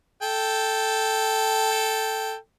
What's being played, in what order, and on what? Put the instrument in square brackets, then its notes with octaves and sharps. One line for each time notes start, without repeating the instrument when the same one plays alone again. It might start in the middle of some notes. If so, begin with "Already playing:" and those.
[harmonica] A4 G5